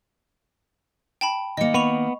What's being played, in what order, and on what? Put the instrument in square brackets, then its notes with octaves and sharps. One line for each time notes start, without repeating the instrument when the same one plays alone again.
[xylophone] G5 A5 B5
[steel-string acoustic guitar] D#3 A#3 [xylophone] D#5 C#7
[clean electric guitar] B3 [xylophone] B5 C#6 F7